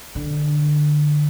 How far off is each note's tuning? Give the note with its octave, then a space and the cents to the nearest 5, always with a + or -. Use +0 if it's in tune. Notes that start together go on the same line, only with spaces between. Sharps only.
D3 +15